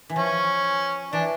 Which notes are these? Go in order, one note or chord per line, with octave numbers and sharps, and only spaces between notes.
E3
F3 C#4
E3 D4